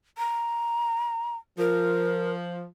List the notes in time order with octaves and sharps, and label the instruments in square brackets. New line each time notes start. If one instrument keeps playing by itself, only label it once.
[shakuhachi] A#5
[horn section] F3 [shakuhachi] A#4